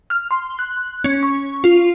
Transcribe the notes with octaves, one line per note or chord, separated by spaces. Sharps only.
F6
C6
F#6
C#4
C#6
F4